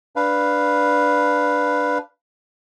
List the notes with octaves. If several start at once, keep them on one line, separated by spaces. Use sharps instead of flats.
D4 B4 F5